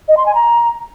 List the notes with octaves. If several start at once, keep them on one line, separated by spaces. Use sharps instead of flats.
D#5
C6
G#5
A#5